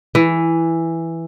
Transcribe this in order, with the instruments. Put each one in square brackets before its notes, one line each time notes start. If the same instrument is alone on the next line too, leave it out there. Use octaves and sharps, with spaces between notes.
[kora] E3